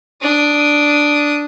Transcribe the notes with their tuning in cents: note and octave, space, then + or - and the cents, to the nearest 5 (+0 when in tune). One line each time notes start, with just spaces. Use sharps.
D4 +0 D#6 +0